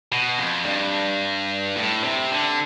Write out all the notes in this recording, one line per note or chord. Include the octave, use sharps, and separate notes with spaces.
B2
F2
G2
A2
C3
D3